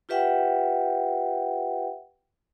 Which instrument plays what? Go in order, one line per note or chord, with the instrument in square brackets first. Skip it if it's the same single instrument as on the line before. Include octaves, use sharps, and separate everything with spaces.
[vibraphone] F4 G4 B4 E5 F#5 G5